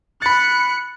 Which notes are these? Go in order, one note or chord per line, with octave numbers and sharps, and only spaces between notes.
B5 F#6 A6 C#7